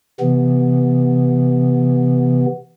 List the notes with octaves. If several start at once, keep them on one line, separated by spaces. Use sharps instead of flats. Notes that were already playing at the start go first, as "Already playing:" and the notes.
C3 E3 B3